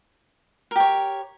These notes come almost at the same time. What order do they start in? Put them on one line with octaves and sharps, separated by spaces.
A#4 G4 C#5